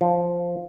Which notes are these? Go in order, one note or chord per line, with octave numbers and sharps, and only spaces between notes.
F3